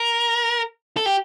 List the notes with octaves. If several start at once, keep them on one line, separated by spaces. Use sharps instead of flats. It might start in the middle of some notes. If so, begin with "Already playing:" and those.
Already playing: A#4
A4
G4